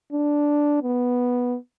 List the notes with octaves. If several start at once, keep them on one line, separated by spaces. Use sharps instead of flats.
D4
B3